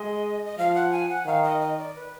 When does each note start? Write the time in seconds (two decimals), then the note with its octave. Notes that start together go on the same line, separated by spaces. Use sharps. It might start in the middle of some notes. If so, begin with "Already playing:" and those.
Already playing: G#3 D#5
0.46 D#5
0.58 F3 F5
0.75 F#5
0.92 G#5
1.09 F#5
1.26 D#3 F5
1.44 D#5
1.61 D#5
1.78 D5
1.95 B4